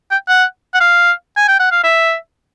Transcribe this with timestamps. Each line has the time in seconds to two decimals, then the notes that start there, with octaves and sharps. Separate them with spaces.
0.11 G5
0.28 F#5
0.74 F#5
0.80 F5
1.37 G#5
1.48 G5
1.60 F#5
1.72 F5
1.84 E5